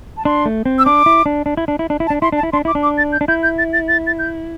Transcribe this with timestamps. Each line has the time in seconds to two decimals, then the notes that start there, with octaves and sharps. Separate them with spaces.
0.17 A5
0.25 D4 C6
0.46 A3
0.66 C4
0.79 E6
0.86 D4 D6
1.06 E4
1.26 D4
1.46 D4
1.57 E4
1.68 D4
1.79 E4
1.90 D4
2.00 E4
2.07 A5
2.10 D4
2.22 E4 C6
2.32 D4 A5
2.43 E4
2.53 D4 C6
2.65 E4 D6
2.75 D4
2.83 D6
2.98 A6
3.13 G6
3.21 D4
3.28 E4 G6
3.43 G6
3.58 A6
3.73 A6
3.88 A6
4.07 A6
4.19 G6